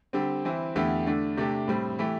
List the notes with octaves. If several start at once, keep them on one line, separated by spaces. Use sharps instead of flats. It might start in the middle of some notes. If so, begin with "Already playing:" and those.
D3 G3 C4 G4
E3 C4 E4
E2 D3 A3 E4 G4
D3 A3 D4
C3 A3 D4 G4
A2 G3 C4
E3 A3 E4 G4